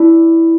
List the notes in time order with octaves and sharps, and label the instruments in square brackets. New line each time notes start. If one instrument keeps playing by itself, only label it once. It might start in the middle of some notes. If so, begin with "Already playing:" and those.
Already playing: [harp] D4 E4